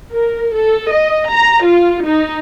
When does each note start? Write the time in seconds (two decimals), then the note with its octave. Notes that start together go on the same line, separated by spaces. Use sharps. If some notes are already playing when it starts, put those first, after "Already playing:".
0.13 A#4
0.54 A4
0.91 D#5
1.30 A#5
1.64 F4
2.04 D#4